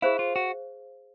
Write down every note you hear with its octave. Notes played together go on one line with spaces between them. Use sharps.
E4 G#4 C5 F5
F4
F#4